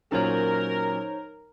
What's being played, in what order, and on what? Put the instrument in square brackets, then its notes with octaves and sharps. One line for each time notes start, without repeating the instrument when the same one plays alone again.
[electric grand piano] A#2 F#3 C#4 [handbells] D#4 C5 C#5 [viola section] A#4